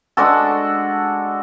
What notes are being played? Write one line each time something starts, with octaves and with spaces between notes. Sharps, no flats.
G#3 D4 F#4 A4